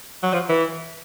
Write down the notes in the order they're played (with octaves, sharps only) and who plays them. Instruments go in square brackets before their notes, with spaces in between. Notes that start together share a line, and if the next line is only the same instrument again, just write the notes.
[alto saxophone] F#3
F3
E3